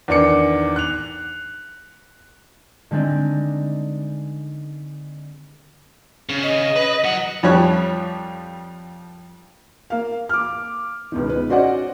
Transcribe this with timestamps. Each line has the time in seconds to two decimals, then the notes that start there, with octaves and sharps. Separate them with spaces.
0.08 E2 D#3 D4 D6 C#7
0.76 F#6 F7
2.91 D3 G#3 C4 D4 D#4
6.29 C#3
6.43 D#5
6.76 B4
7.04 F#3 F#5
7.43 F2 F3 G3 G4 C#5 F#6
9.90 A#3 F5
10.29 D6 F6
11.12 C#2 B2 D#3
11.29 B4
11.49 C#4 F#4 C5 D5 D#5 F#5